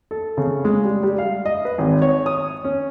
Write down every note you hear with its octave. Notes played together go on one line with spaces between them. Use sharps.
A4
C#3
G#3
G3
G3
F5
D#5
B4
G#1
C#5
D#6
C#4